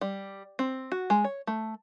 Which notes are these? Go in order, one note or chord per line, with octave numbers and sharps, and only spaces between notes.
G3
C4
F#4
G#3
C#5
A3